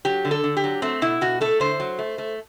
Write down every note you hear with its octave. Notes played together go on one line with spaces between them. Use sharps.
F#3 G4
D3
A4
D3
G4
F#3
A3 C4
B2 E4
B2 F#4
A3 A4
D3 C5
F#3
A3
A3